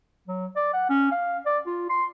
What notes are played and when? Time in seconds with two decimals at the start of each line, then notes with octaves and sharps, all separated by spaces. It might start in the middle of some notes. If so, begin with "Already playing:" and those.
0.28 F#3
0.56 D5
0.74 F#5
0.89 C#4
1.12 F5
1.46 D5
1.66 F4
1.90 C6